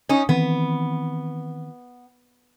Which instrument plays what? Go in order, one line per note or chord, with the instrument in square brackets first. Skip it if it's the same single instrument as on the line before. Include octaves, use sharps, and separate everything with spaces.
[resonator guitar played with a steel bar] C#4 D#4
[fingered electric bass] D#3 E3 C4 [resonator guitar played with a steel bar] B3